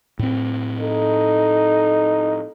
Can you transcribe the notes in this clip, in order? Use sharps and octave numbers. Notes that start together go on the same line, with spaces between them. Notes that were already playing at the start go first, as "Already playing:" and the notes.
A2 C4
D#4 A4